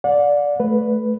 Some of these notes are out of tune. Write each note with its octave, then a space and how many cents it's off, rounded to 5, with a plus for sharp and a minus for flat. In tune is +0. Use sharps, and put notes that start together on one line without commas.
D5 -10 F#5 -45
A3 -15 B4 +0